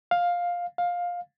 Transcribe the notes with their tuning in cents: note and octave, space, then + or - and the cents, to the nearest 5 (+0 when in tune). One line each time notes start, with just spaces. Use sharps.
F5 +10
F5 +15